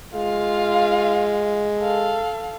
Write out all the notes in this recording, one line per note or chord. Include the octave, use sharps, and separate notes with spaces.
G#3 F4 F5
A4 F5